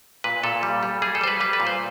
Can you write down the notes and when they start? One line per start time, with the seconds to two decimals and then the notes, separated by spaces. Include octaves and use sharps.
0.24 A#2 B4
0.43 A#2 A4
0.63 G3
0.83 G3
1.02 G3 G#4
1.15 A4
1.21 G3 C5
1.27 B4
1.40 G3 B4
1.53 B4
1.60 A#2
1.67 C5